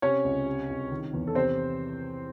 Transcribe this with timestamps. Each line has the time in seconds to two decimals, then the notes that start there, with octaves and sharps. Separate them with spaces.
0.02 C3 C#4 C#5
0.24 C#2
0.46 C3
0.69 C2
0.91 D#3
1.13 E2
1.27 A4
1.35 C3 C4 C5